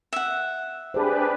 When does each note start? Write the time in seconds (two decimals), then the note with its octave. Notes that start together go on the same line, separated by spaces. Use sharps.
0.13 E5 F#5
0.94 D4 G4 G#4 B4 C5